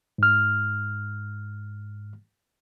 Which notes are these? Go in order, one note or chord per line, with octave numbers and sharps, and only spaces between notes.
G#2 F6